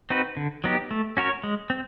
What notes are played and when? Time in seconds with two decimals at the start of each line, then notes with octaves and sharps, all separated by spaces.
0.10 C4 D#4 F#4 B4
0.37 D3
0.64 F#3 B3 D#4 G4
0.91 A3
1.17 C#4 F#4 A#4 C#5
1.44 G#3
1.70 C4